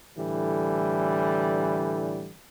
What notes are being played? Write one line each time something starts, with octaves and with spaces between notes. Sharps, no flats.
A2 D3 E3 G3